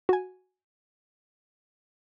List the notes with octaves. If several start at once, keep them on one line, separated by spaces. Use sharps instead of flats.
F#4 G#5